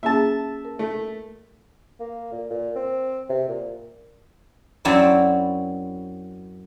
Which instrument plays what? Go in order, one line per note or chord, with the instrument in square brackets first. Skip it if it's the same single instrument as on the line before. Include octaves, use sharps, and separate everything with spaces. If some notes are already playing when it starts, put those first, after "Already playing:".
[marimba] A#3 C#4 G#4 [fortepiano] E5 A5
[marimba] A#4
[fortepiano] A3
[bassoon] A#3
A#2
A#2
C4
C3
A#2
[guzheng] F#2 F#3 C4 E4 D5